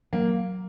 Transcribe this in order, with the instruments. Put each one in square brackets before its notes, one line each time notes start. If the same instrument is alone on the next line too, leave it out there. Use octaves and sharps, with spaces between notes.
[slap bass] F#3 [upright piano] A#3